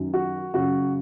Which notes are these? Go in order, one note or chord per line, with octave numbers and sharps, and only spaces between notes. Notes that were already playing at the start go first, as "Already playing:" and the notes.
Already playing: F#2 D#3 F#3
F#4
F#2 C#3 F#3 F#4